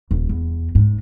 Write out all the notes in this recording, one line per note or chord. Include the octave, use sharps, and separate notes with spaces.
D#1
E2
G#2